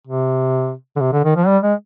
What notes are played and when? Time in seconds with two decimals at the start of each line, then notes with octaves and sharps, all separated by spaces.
0.07 C3
0.96 D3
1.00 C3
1.13 D3
1.24 D#3
1.36 F3
1.47 G3
1.63 G#3